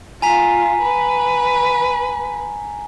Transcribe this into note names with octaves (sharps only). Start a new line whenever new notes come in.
F4 G#5 A#5 B6
B4